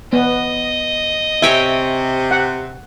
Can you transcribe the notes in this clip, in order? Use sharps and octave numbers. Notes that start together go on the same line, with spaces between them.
B3 D#5
C3 C#5 E5 G5 G#5
F#5